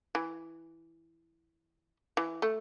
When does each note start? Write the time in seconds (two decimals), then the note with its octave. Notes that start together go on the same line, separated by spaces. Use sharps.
0.15 E3
2.17 E3
2.42 A3